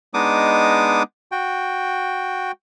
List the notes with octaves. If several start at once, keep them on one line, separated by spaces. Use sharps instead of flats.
G#3 B3 D4 D#4 D6 D#6
F#4 G5